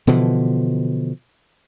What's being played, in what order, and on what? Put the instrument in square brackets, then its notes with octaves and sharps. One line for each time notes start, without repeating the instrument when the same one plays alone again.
[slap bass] B2 D3 E3 F3